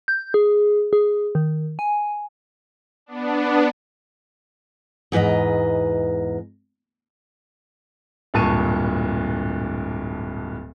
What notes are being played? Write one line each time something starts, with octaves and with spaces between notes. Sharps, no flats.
G6
G#4
G#4
D#3
G#5
B3 D4
E2 G#2 B4 D#5 A#5
D1 G2 A#2 A5 C#6 D#7